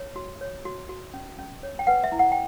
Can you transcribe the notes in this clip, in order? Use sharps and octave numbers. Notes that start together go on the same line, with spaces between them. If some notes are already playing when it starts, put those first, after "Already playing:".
Already playing: C#5
F#4
C#5
F#4
F#4
C#4
C#4
C#5
G5
B4 F#5
E5
E4
F#5
G5